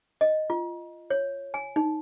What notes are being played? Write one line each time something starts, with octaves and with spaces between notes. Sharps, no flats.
D#5
F4
C#5
G#5
D#4